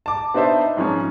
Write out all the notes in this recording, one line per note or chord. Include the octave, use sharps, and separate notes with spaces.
A5 D6
B3 D4 D#4 C5 E5 A5
G#2 F3 C#4